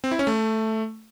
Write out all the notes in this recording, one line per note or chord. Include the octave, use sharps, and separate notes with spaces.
C4
E4
C#4
A3